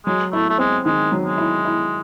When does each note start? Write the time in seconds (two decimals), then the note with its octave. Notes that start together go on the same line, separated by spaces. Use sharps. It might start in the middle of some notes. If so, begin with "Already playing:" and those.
0.06 F#3 G#3
0.33 A3 E4
0.50 A3
0.58 G#3 C4
0.85 D#3 G#3
1.12 F#3
1.25 G#3
1.38 E4
1.65 E4